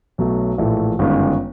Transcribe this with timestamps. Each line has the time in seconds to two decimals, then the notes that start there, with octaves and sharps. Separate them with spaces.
0.18 B1 B2 F#3 A3
0.58 A#1 A2 E3 A3
0.99 G1 F#2 D#3 G#3